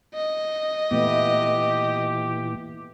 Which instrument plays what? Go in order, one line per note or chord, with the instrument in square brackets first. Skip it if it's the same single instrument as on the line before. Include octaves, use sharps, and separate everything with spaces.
[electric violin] D#5
[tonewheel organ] A#2 E3 [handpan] A3 B3 [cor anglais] G4